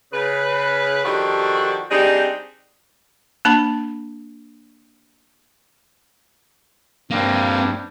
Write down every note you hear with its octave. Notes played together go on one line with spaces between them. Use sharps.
C#3 B4
D#3 F3 D4 F#4 G4 A4
G3 C4 D4 D#4 G4 G#4
A#3 D4 A5 B5
G2 A#3 C4